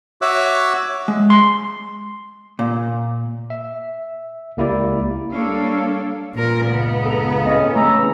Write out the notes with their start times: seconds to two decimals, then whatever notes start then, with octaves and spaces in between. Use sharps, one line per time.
0.22 F#4 C#5 E5 D6 E6 F#6
1.08 G#3
1.30 C6
2.59 A#2
3.50 E5
4.57 C#2 A#3 E4 G4 D5
5.32 G3 A#3 D4 A4 C#5 F5
6.34 A#2 A#4
6.68 C#2 G2 C#3 B3
7.06 A4 A#5
7.46 F#2 A2 C4 C#4 D#5
7.76 C#3 E3 A3 C#4 B4 A#5 E6